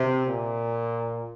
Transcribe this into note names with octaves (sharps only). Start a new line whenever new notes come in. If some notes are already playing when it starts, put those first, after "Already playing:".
Already playing: C3
A#2